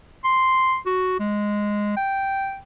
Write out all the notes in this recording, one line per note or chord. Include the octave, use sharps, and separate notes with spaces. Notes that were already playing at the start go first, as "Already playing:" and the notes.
C6
F#4
G#3
G5